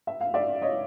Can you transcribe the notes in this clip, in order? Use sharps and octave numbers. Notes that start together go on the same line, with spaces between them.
E5
F5
D5 E5
C#5 D#5